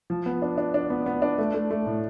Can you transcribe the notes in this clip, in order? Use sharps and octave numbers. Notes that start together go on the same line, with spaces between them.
F3
B3
D4
D4
D4
B3
B3
D4
A3
A3
A3
A2